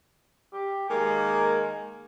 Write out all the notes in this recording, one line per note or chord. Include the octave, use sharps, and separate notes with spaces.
G4
D#3 G#3 A#3 G#5